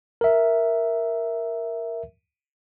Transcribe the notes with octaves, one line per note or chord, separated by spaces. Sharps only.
A#4 E5